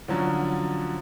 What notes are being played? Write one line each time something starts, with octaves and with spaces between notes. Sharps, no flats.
D3 F3 F#3 C#4